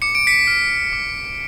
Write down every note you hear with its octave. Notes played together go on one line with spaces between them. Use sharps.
D6 C#7
D7
B6 C#7
F6
D6